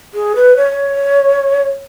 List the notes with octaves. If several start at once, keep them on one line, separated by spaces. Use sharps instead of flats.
G#4
B4
C#5